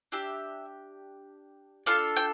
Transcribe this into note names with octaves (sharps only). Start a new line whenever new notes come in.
D4 G4 E5
D4 F4 A4 F5
G5